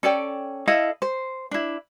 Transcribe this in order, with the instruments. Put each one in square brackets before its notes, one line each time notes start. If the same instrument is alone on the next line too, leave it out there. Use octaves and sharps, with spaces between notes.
[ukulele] C#4 A4 D5 G5
E4 A4 D#5 F5
C5
D4 E4